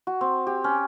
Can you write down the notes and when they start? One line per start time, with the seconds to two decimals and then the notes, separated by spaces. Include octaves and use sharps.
0.07 F#4
0.21 C4
0.47 G4
0.64 C#4